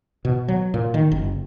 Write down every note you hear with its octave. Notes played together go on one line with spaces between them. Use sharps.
B2
F#3
A#2
D#3
F#1